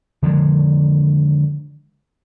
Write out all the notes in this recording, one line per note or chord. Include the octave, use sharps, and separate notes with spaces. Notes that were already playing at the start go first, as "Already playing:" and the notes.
D3 D#3 F3 G#3